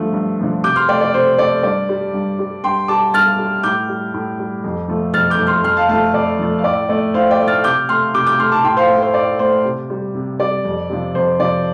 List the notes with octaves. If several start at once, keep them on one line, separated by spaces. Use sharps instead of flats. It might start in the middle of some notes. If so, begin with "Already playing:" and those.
Already playing: G2 D3 F3 A3
G2
D3 F3 A3
C3 D6 G6
C6 F6
A3 D5 G5
D5
C3 C5
A3 D5
G2 D5
G3
G2
G3
G2 G5 C6
G3 A5 D6
G2 F6 A6
G3
A2 D6 G6
G3
A2
G3
F2
F3 A3
F2 F6 A6
D6 G6
F3 A3
C6 F6
F2 C6 F6
F5 A5
F3 A3 F5 A5
F2 D5
F3 A3
F5
A2 D5
A3 D5
A2 C5 F5
D5 G5
A3
F6 A6
C3 D6 G6
A3 C6 F6
C3 D6 G6
D6 G6
A3 C6 F6
A5 D6
A2 G5 C6
C5 F5
A3
C5
A2 D5
A3 C5
C3
G3
C3
G3 D5
F2
C3 F3
F2 C5
C3 F3 D5